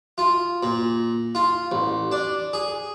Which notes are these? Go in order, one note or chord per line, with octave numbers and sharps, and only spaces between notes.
F4
A#2
F4
A1
D4
G#4